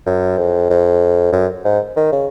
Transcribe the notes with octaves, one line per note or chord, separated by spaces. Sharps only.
F#2
F2
F2
F#2
G#2
D#3
C#3